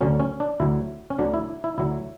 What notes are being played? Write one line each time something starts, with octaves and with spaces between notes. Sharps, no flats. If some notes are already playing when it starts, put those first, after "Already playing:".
D2 D3 F#3 C#4
C#4
D4
D2 D3 F#3 E4
C#4
D2 D3 F#3 D4
E4
E4
D2 D3 F#3 E4